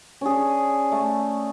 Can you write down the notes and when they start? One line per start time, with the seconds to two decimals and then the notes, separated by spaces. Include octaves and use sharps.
0.21 C#4 D4 G#4
0.91 A3